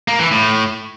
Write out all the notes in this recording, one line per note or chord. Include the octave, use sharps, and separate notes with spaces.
A#3
E3
A2